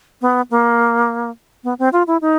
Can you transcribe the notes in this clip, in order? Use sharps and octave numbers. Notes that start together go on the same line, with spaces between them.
B3
A#3
B3
C4
F4
E4
D#4